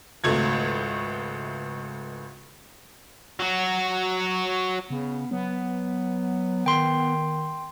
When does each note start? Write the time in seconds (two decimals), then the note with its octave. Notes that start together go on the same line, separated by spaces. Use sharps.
0.24 G#1 C#2 A3 G#6
3.40 F#3 F#4
4.90 C#3 B3
5.31 F#3 B3
6.66 D#3 G5 C6